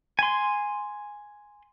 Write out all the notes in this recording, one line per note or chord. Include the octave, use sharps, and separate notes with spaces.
G#5 C6